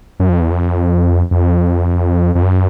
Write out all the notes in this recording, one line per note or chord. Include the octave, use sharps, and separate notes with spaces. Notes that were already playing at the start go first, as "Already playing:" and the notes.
F#2
F2
E2
F2
F2
F2
F#2